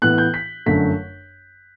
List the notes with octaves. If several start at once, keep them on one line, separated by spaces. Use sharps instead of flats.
A2 E3 B3 E4 F#6
G6
B6
G1 F#2 D3 A3 B6